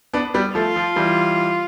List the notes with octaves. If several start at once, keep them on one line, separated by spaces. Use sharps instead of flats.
B3 D4
G3 B3
F3 A3 F4
F3
E3 G3